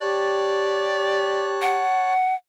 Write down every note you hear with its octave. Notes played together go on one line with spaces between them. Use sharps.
G4 C#5 D5 A5 F#6
F#5